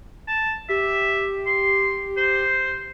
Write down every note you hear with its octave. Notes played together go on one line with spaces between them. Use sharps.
A5
G4 E5
C6
C5